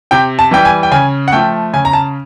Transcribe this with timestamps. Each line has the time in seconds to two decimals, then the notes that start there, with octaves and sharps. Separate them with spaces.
0.11 C3 G5
0.39 A5
0.51 E3 G3 G5
0.65 G#5
0.83 G5
0.91 C#3 G#5
1.28 F#5
1.32 F3 A3 G5
1.73 C#3 G#5
1.85 A#5
1.93 A5